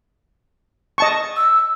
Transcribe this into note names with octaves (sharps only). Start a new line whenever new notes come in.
D#5 A5 C#6
E6